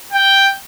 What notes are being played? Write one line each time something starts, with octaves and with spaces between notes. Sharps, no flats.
G5